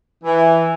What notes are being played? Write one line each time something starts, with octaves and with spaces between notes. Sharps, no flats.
E3